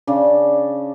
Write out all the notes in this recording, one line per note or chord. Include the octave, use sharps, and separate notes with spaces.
C#3 D4